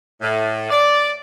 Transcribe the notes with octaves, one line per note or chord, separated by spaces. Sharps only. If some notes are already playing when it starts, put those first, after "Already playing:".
A2
D5